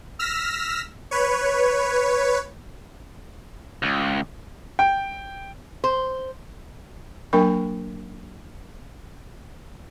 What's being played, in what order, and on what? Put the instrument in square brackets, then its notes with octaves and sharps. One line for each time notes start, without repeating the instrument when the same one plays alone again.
[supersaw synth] E6 F6 A#6 B6
B4 C#5
[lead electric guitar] C#2
[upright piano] G5
[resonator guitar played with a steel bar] C5
[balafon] F#3 A#3 D4 A#4 G5 C#6